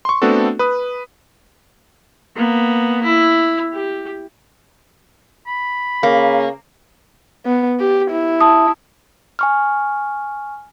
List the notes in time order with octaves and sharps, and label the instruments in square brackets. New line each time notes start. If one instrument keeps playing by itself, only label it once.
[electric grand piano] C6 C#6
A3 B3 C4 D4 F#4 A4
B4 D#6
[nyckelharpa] A#3 B3
E4
G4
[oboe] B5
[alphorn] C#3 [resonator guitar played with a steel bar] A#3
[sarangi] B3
G4
E4
[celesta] A5 D#6
[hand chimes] G#5 C#6 F6